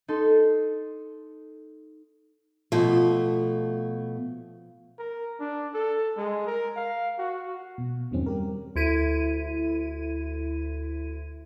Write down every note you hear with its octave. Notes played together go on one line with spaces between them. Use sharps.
D#4 A4 C6
B2 F3 A3
A#4
D4
A4
G#3
A#4
F5
F#4
B2
E2 G2 D#3 F#3 C4 C#4
G3 G4 A#4
D2 E4 D#7